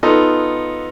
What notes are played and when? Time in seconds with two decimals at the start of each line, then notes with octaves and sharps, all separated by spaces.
0.03 B3 D#4 F4 A4